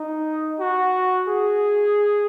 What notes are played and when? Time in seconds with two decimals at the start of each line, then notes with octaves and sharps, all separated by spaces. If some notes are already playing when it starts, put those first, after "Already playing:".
Already playing: D#4
0.59 F#4
1.28 G#4